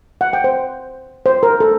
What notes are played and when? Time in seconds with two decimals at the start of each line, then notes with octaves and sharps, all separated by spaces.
0.21 F#5
0.33 G5
0.44 C5
1.26 C5
1.43 A#4
1.60 A4